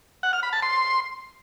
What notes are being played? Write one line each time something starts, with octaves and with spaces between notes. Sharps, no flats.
F#5
F6
B5
A5
C6